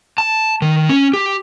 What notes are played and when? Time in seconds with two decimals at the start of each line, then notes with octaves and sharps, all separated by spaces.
0.18 A5
0.62 D#3
0.89 C#4
1.13 G4